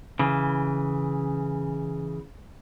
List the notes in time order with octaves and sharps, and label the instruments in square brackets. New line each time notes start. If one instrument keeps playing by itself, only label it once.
[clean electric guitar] C#3 E3